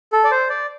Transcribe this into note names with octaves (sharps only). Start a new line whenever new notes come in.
A4
D5
C5
D5